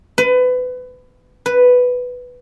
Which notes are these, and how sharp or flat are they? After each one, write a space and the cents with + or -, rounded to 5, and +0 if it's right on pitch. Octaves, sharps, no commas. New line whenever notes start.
B4 +25
B4 +5